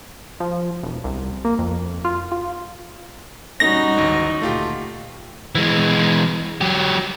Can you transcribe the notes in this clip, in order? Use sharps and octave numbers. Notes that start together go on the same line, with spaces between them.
F3
E1
C2
A#3
F2
F4
F4
G3 C#4 D#4 F#4 A#6
A1 D2 G#2 D#3
D2 A#2 A3 F4 G4
E3 G#3
F#3 G4